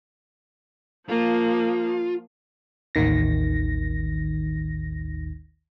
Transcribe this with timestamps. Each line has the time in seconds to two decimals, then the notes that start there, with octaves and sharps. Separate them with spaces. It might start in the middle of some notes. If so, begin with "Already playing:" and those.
1.09 F3 A#3 F4
2.95 A1 D#2 D#3 A#6